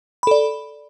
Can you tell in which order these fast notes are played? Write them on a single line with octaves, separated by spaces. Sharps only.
B5 A4 D5